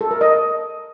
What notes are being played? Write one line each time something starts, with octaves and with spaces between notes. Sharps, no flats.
A4
A#4
D#5